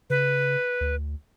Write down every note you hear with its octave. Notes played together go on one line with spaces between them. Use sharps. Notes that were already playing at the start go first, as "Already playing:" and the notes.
C#3 B4
D2